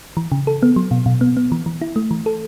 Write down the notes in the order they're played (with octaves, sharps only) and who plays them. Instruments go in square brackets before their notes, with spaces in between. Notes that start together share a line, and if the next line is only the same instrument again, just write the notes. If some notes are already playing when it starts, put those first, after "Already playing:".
[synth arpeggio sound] E3
C#3
A4
B3
F#3
B2
B2
B3
B3
E3
E3
E4
A3
E3
A4